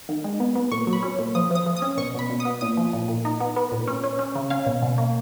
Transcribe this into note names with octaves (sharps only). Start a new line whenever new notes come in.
D#3
G#3
B3
B3
A#2 C#6
F#3
B5
C#4
A#2
F3 D#6
F3 D#6
F3
D#6
C#4
B2 C#6
B2 B5
B2
D#6
B3
A#2 D#6
F3
A#2
A#2
D#4
B3
B3
A#2
C#4
C#4
C#4
C#3
C#4 F5
B2
B2
A#3